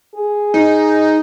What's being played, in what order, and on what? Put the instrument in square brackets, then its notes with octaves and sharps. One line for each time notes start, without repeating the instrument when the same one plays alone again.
[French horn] G#4
[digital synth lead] D#4